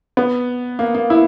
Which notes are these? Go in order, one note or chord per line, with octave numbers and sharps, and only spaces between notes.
B3
A#3
A#3
E4